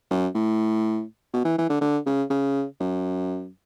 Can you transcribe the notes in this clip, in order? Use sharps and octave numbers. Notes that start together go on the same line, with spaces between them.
F#2
A2
B2
E3
E3
D3
D3
C#3
C#3
F#2